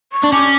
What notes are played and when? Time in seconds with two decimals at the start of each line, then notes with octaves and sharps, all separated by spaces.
0.13 C#6
0.23 D4
0.32 C#4 D6